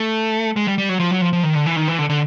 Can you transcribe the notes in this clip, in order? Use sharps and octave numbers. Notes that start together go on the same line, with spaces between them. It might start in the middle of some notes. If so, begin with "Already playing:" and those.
Already playing: A3
G#3
G3
G3
F#3
F3
F#3
F3
F3
D#3
D3
E3
D#3
E3
D3
D3